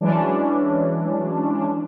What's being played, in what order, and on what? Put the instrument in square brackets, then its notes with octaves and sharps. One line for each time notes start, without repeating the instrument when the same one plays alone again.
[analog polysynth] E3 F#3 G#3 C#4 D4